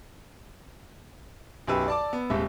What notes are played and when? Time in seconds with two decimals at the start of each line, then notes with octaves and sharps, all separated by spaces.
1.67 B1 F#2 G4 B4 E6
1.88 D5 A5 D6
2.13 B3
2.30 D#1 G#2 C3 E5